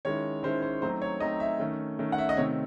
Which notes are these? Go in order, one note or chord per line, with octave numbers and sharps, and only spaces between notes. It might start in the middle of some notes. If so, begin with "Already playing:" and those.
D#3 G#3 C#4 E4 C#5
D#3 G#3 C#4 E4 C5
C5
F#3 A3 C4 D#4 C5
C#5
F#3 A3 C4 D#4 D#5
E5
D#3 A3 C#4
D#3 A3 C#4
F#5
E5
D#5
C3 D#3 A3 C#5